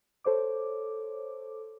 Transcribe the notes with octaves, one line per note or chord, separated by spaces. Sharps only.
A4 C5 C#5 D6